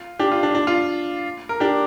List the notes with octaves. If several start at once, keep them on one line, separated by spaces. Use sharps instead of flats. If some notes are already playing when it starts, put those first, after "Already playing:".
Already playing: F4
D4 G4
F4
D4
D4
F4
A#4
D4 G4